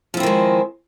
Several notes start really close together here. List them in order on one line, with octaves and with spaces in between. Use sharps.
F3 E4 C4 D#3 G#3